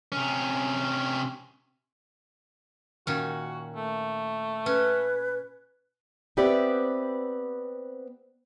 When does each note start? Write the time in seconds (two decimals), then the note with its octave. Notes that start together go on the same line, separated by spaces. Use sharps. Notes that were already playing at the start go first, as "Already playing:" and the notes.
0.12 C3 C#4
3.07 A#2 D#3 C#4 F#4
3.76 A3
4.66 C#4 B4
6.37 B3 C4 G4 B4 D5 E5